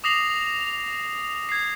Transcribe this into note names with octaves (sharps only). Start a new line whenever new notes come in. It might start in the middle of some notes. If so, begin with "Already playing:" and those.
D6 D#6 A#6 C7 F7 F#7
G#6 C7